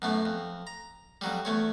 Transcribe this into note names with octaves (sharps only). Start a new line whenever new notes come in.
F#2 B2 A3
F2
A#5
F2 F#3 G3
E2 A3 C#5